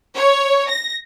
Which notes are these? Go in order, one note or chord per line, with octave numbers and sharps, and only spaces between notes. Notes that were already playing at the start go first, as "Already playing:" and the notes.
C#5
A#6